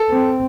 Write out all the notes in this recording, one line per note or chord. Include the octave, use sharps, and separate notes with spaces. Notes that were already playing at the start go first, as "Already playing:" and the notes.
Already playing: A4
C4